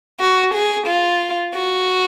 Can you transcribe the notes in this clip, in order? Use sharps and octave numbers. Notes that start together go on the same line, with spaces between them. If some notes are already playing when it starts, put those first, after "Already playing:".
F#4
G#4
F4
F#4